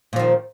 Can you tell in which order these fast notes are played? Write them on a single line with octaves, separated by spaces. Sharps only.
A#2 F3 D#3